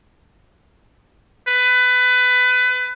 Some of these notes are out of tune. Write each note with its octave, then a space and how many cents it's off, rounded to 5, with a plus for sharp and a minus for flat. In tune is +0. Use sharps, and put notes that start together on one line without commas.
B4 +20